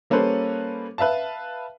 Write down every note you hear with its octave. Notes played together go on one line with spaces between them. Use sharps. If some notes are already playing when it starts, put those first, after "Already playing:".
G3 A#3 C#4 A4 B4 C5
B4 E5 F5 A5